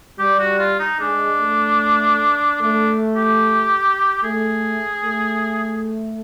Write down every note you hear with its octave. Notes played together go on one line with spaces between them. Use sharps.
G3 G4
F#4
F4
D#4
G#3 D4
A3
A3 D4
G4
A3 G#4
A3